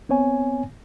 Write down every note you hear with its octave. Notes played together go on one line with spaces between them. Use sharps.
B3 C4 C#5 G#5